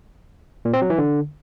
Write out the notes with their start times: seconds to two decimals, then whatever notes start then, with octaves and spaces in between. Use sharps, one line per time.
0.65 A#2
0.73 C4
0.82 F#3
0.90 E3
0.98 D3